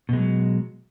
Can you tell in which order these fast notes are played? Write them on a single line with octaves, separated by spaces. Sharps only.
B2 G#3 F#3